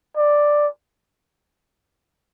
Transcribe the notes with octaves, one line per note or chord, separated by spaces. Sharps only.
D5